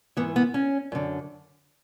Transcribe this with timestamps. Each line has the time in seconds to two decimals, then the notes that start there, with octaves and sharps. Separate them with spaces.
0.17 G#2 E3 B3
0.36 B3
0.54 C#4
0.92 F#2 D3